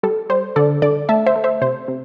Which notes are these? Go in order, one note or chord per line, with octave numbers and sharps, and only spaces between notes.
G3 A4
G3 C5
D3 A4 D5
D3 A4 D5
A3 E5 A5
C5 E5
A3
C5 E5
C3 C5
C3